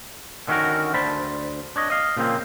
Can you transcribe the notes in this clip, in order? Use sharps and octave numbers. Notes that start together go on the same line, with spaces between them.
D3 D#3 C#4 D#4 F#4 A#4
D2 D4 C5 A5 B5
D4 C#5 D#5
D#5 F5
A#2 C#3 F3 A#3 C4